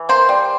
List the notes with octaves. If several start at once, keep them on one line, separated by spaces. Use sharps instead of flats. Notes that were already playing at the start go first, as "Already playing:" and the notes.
Already playing: E3
A#3 C5
G3